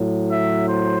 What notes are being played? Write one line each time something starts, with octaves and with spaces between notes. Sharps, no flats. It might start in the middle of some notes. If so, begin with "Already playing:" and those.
Already playing: A2 F#3
E5
C5